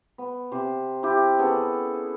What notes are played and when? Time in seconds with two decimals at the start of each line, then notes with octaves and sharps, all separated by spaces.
0.18 B3
0.52 C3 C5
1.03 E4 G4
1.39 B3 C#4 G#4 A4